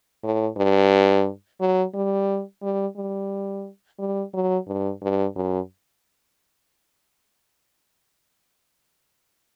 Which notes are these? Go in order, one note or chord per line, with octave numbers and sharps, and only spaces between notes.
A2
G2
F#3
G3
G3
G3
G3
F#3
G2
G2
F#2